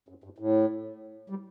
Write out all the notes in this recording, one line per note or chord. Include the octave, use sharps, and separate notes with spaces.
F#2
G2
A2
G3